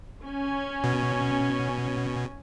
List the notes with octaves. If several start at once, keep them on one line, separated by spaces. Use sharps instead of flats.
C#4 G#5
B2